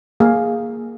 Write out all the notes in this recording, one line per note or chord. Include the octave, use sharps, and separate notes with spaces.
A#3 G#4 F5